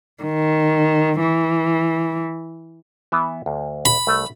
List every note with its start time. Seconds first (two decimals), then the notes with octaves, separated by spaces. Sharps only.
0.23 D#3
1.21 E3
3.12 E3 B3 E5
3.46 D2
3.85 B5
4.07 C2 A3